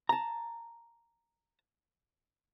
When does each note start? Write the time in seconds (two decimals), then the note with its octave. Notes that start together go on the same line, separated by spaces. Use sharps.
0.09 A5 A#5